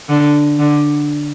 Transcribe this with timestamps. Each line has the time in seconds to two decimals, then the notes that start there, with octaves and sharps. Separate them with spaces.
0.09 D3
0.59 D3